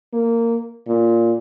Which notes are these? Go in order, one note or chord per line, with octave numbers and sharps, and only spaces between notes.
A#3
A#2